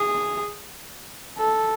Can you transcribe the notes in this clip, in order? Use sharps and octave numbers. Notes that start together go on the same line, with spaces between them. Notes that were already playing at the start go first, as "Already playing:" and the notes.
Already playing: G#4
A4